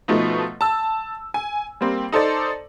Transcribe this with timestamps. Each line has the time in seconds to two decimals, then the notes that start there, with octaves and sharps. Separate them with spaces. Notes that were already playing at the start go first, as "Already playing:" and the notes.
0.08 B2 F3 A3 D#4
0.61 A5 E6
1.34 G#5
1.81 G3 A#3 C4
2.12 D#4 A4 C5 D5